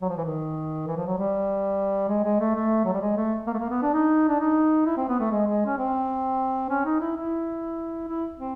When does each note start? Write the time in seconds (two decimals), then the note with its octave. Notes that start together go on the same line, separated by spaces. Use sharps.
0.02 F#3
0.09 F3
0.17 E3
0.24 D#3
0.87 E3
0.97 F3
1.07 F#3
1.17 G3
2.09 G#3
2.24 G#3
2.40 A3
2.55 A3
2.85 F#3
2.94 G3
3.01 G#3
3.17 A3
3.47 A#3
3.54 A3
3.59 A#3
3.70 B3
3.82 D4
3.93 D#4
4.28 D4
4.40 D#4
4.86 E4
4.97 C4
5.09 B3
5.20 A3
5.31 G#3
5.47 G#3
5.66 C#4
5.78 C4
6.70 C#4
6.85 D#4
7.01 E4
7.16 E4
8.08 E4
8.39 C4